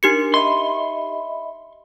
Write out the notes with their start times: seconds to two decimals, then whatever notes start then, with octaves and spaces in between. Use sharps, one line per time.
0.03 D4 D#4 G4 A#4 C#7
0.34 D#5 E5 B5 C6